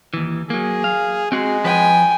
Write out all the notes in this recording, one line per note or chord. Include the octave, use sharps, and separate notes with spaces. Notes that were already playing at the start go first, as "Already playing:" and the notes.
D#2 E3
F#3 A#3 G#4
F5
G#3 C4 F#4 G#4
F3 B4 G5 G#5